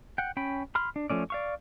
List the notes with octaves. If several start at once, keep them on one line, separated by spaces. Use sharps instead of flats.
F#5 G5
C#4 G5 B5
B5 C6 F6
D4
F3 A3 C#4 D5
D5 F5 C#6